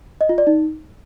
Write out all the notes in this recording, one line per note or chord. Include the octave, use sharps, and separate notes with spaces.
D#5
F4
D5
D#4